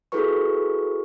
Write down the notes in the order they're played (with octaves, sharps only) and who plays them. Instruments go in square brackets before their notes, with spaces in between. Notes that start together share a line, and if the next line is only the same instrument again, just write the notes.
[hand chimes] E4 F#4 G#4 A4 B4 C#6